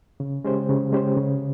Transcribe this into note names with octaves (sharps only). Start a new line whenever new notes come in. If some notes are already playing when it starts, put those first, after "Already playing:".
C#3
G#3 C#4 G4 C5
C#3
G#3 C#4 G4 C5
C#3